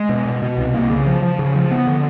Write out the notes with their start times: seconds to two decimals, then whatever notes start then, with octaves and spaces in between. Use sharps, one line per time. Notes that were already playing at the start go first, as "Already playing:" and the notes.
Already playing: G#3
0.09 B2
0.25 B2
0.42 B2
0.57 C2
0.74 A#3
0.90 C#3
1.06 F3
1.23 F3
1.39 C#3
1.55 F3
1.71 B3
1.87 D3